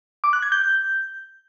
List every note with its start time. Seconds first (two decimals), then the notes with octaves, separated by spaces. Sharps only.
0.24 D6
0.33 F#6
0.42 G#6
0.52 G6